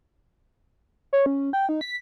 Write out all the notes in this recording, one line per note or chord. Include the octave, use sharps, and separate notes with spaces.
C#5
C#4
G5
D#4
B6